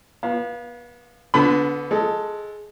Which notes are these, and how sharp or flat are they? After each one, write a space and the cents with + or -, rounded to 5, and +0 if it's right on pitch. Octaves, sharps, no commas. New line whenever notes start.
B3 -30 F5 +0
D3 -25 B3 +0 B5 +25
G#3 +10 A4 -5